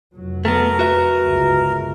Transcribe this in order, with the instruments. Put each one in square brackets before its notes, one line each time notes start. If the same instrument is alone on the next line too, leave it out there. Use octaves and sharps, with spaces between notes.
[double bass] F1 F#3
[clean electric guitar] A3 B3 [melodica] A#4
[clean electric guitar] F#4 B4 E5
[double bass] G1 C#2